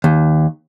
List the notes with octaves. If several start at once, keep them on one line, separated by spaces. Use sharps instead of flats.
D#2